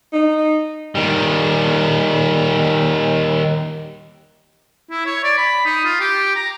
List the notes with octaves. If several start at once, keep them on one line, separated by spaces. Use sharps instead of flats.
D#4
D#3 G3
E4
C#5
D5
B5
D#4
F4
G4
A#5